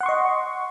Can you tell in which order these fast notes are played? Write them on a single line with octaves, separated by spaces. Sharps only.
F#5 C6 C#6 D#5